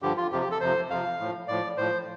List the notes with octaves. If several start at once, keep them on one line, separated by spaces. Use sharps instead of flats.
G2 D3 F3 G4
F4
F2 C3 F3 G4
G4
A4
F2 C3 F3 C5
F2 C3 F3 F5
A2 F3
A2 F3 D5
A2 F3 C5